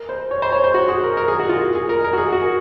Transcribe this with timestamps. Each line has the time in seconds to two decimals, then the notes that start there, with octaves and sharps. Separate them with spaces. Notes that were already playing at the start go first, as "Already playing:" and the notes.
Already playing: A#4
0.09 C5
0.31 C#5
0.42 C5
0.52 C#5
0.64 C5
0.74 F#4
0.88 G#4
1.03 A#4
1.17 A#4
1.28 G#4
1.39 F#4
1.49 F4
1.75 G#4
1.89 A#4
2.04 A#4
2.13 F#4
2.18 G#4
2.33 F#4